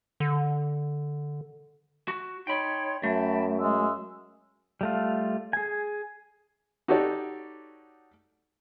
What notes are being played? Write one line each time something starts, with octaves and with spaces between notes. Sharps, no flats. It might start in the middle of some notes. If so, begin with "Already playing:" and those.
D3
F#4
D#4 C#5 G5 B5 C6
F#2 A3 G5 A5 B5
G#3 E6
G3 A3 F4
G#4 G#5
D#4 F#4 G4 A4 C#5 D5